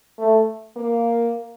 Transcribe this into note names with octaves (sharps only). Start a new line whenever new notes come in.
A3
A#3